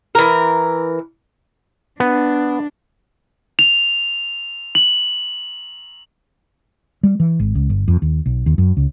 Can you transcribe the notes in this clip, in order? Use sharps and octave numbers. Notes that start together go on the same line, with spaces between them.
E3 A#4
B3 D4
F7
F#7
G3
E3
G#1
C#2
G1
F2
D#2
B1
D#2
F#2
C#2